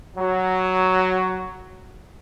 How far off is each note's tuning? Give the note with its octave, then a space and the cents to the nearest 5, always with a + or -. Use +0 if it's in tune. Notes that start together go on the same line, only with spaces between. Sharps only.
F#3 +5